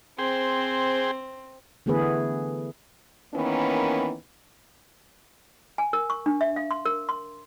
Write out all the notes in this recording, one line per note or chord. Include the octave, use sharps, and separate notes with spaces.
C4 G#4 C5 G5
D3 E3 A3 B3 G#4 B4
D#3 E3 A#3 B3 C#4
G#5
A#4
C#6
D4
E5
F5
C6
A#4
C6